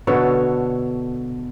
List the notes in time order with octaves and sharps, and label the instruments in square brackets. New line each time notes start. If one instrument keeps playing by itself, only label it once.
[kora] B2 D3 A4 C#5